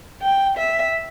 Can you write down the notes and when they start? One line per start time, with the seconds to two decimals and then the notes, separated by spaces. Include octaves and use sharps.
0.22 G5
0.58 E5